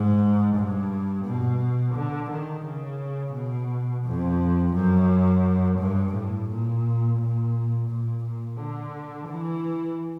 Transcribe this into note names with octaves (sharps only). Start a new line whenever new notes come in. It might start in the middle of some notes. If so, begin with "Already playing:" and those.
Already playing: G#2
G2
B2
D3
D#3
C#3
B2
F2
F#2
G2
A2
A#2
A#2
A#2
A#2
D3
E3